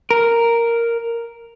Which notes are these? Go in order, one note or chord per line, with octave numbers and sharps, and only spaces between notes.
A#4